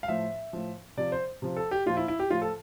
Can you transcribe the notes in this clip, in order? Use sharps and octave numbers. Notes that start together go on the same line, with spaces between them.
F5
A2 F3 E5
A2 F3
C3 F3 D5
C5
C3 F3
A4
G4
A#2 F3 F4
E4
E4
G4
A2 F3 F4
A4